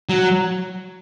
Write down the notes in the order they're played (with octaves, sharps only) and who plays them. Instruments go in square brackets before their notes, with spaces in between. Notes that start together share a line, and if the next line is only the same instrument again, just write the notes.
[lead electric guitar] F#3